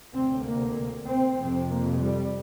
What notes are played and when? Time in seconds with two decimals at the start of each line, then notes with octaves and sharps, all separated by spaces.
0.14 D2 C3 C4
0.45 A#3
1.07 C4
1.37 F2 C3
1.69 A#3
1.99 G3